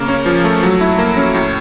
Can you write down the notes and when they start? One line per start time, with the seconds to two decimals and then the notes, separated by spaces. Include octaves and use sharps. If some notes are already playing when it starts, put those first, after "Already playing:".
Already playing: C#3 A#3
0.08 C#4
0.26 F3
0.44 A3
0.63 F#3
0.81 E4
0.98 A#3
1.17 C#4
1.34 A2